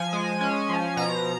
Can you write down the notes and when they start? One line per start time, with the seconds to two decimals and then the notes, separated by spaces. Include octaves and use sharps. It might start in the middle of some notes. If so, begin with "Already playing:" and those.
Already playing: F3 G#5
0.13 G#3
0.41 C#4
0.69 F3
0.97 B2 A#5